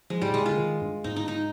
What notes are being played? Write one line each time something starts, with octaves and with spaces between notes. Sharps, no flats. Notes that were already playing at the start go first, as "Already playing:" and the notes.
F3 G#3
G#2 G3
A#2 G#3
C3
D3 F4
D#3
G2
G#2 D#4
D#4
D#4